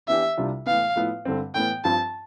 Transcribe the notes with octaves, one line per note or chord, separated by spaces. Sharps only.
E3 B3 D4 G4 E5
C2 C3 G3 D4 F4
A2 E3 B3 F5
A2 F3 B3 E4 B4
G2 D3 G3 C4
A2 E3 B3 G5
G2 F3 C4 A5